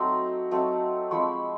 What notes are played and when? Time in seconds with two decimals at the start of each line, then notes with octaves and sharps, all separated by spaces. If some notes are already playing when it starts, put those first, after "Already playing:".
Already playing: F#3 A3 C4 D#4 A#5 C6
0.51 F#3 A3 C4 D#4
1.11 F3 G#3 C4 B5 C#6